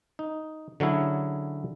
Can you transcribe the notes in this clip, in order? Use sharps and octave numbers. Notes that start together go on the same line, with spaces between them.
D#4
D3 F#3 C#4 E4 G#4